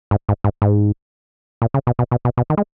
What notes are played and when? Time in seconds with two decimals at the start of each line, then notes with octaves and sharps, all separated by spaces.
0.11 G#2
0.29 G#2
0.44 G#2
0.62 G#2
1.62 A#2
1.74 C#3
1.87 B2
1.99 B2
2.11 B2
2.25 B2
2.37 B2
2.50 D#3
2.57 G#3